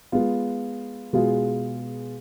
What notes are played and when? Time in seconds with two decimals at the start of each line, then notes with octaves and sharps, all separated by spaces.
0.12 G#3 B3 F4
1.13 B2 G#3 B3 F4 G#4